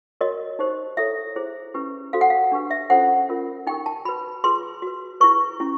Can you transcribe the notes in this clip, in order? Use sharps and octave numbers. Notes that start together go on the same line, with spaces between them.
F#4 A#4 C#5 D#5
D#4 G4 C5
E4 A4 C#5 E5
E4 G#4 C5
C#4 E4 G4 B4
F#4 A4 C5 F5
F#5
F5
D4 G4 B4
E5
C#4 F4 A4 C5 F#5
C#4 F4 A#4
D#4 G4 A#4 G5
A5
F#4 B4 B5
F4 G#4 B4 C6
F#4 B4
E4 G#4 B4 C#6
C#4 E4 G4